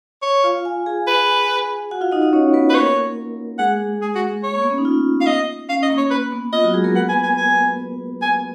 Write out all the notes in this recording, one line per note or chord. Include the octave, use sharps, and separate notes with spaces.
C#5
F4 F5
G#5
G#4 G#5
B4
F#4 F#5
F4 F5
D#4 D#5
D#4 D#5
C#4 C#5
B3 B4
B4
A#3 A#4 C#5
G#3 G#4 F#5
G#4
F#4
C#5
A#3
B3
C#4
D#4
F4
F5
D#5
C#4 F5
D#5
A#3
C#5
A#3 B4
B3
F4 D#5
F#3 F#4
G#3 G#4
A#3 A#4
B3 B4 F#5
G#5
G#5
G#5
G#5